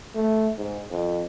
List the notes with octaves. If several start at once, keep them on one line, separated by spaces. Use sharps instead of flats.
A3
G#2
F2